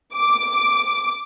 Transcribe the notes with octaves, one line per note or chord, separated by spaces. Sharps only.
D6